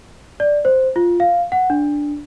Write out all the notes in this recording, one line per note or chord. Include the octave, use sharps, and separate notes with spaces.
D5
C5
F4
F5
F#5
D4